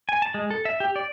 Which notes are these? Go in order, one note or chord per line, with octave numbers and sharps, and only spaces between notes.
G#5
A5
G#3
A4
E5
G4
D5